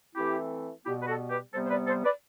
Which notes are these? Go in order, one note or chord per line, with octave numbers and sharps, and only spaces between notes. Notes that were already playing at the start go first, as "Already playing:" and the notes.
E3 A3 C4 E4 G4
B2 G3 B3 E4 G4
B4
F#4 A4
G4 B4
C3 G3 B3 A4 C5
C5
B4 D5
A4 C5
B4 D5